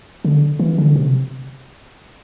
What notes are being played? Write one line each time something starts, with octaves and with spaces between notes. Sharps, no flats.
D3
E3
D3
C3